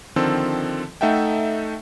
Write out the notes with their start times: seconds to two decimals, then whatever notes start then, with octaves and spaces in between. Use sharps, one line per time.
0.16 D3 D#3 F3 C4 A4
1.01 A3 D#4 A4 E5 F#5 G5